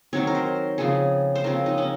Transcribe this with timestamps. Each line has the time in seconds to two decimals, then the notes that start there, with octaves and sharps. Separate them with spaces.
0.13 D#3 F#3 C4 C#5
0.27 A#4
0.35 C5
0.78 C#3 F3 C4 G#4
1.35 C5
1.44 C#3 F3 C4 A#4
1.66 D#4
1.78 C#4